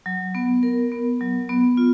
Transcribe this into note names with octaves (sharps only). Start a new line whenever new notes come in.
F#3
B3
A#4
B3
F#3
B3
F4